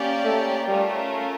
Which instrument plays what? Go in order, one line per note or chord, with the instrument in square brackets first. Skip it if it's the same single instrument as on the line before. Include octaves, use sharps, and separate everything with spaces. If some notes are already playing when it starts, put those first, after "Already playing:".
Already playing: [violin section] A#3 C#4 G4 D5 G5
[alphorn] A3
[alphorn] G3 [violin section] A3 C#4 F4 A#4